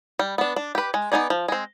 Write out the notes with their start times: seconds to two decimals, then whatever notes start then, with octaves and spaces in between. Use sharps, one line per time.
0.19 G3
0.38 B3 D4
0.56 D4
0.75 G4 B4
0.94 G#3
1.12 B3 D#4 G#4 D5
1.30 F3
1.48 G#3 C4